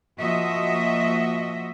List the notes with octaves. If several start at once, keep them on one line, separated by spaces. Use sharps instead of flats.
F3 A#3 F#4 D#5 E5